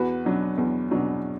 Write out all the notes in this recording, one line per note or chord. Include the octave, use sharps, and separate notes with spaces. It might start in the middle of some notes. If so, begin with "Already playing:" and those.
Already playing: E2 F#4 B4
B2 F#3 D4
E2
B2 F#3 D4